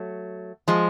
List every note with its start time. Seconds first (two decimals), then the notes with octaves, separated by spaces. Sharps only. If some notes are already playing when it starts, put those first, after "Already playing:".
Already playing: F#3 A3
0.68 F3 G#3